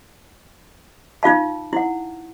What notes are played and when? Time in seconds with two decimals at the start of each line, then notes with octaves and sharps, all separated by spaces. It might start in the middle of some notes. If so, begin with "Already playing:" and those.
1.23 D#4 F4 F5 A5
1.73 E4 F#5